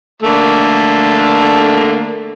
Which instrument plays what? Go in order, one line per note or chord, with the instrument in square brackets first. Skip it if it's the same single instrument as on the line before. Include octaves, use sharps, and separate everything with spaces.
[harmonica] D3 A3 A#3